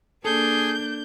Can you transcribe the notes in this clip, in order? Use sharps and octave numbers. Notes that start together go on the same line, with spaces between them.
A#3 D4 G#4 A4 G6